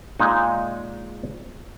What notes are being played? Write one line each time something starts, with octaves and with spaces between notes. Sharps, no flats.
A#2 G#3 D#4